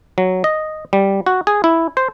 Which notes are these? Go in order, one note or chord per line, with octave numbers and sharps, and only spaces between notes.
F#3
D#5
G3
F#4
G#4
E4
C5